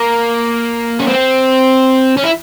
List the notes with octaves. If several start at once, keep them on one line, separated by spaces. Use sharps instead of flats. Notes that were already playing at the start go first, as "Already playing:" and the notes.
Already playing: A#3
C#4
C4
C#4
E4